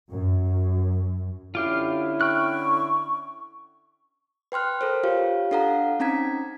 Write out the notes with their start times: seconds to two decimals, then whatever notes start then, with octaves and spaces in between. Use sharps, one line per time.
0.12 F#2
1.55 D3 C#4 E4 F4 G4 F5
2.21 G5 C#6 F6 F#6
4.52 B4 G5 C6 F6 F#6
4.81 A4 A#4 C5
5.03 F4 G4 C#5 F5
5.51 D4 A4 F5 F#5 A#5
6.00 C4 C#4 D#4 A#5 G#6 B6